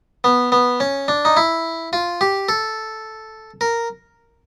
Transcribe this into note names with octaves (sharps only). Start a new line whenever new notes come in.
B3
B3
C#4
D4
D#4
E4
F4
G4
A4
A#4